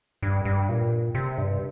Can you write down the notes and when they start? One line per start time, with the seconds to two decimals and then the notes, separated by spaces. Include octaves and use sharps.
0.23 G2
0.45 G2
0.69 A#2
1.15 C3
1.38 G2